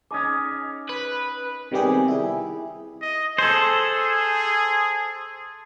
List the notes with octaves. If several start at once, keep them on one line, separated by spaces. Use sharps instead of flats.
C#4 D#4 G#4 D6 D#6
B4
C3 D#3 G3 B3 G4 G#4
E4 G#4
D#5
G#4 A4 C5